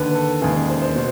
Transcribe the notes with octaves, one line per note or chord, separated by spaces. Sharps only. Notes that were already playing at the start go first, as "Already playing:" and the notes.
Already playing: D#2 D3 B4
A4
E1 D#2 C#3 G#4
C5
C5
B2